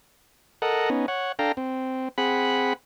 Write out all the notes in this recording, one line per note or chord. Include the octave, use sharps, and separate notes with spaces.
A4 A#4 D#5 F#5
B3 C#4 D#4
C#5 F#5
D4 A4 F5 G5 A#5
C4
C4 G#4 F#5 B5